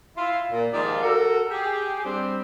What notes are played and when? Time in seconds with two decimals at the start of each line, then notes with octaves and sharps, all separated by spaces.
0.18 E4 F4
0.52 A#2
0.74 G#2 D#3 F3 F4 G4 D5
1.03 F#4 A4 A#4
1.51 G4 G#4
2.05 G3 C4 D4